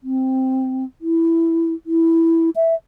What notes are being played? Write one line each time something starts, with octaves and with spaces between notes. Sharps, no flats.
C4
E4
E4
E5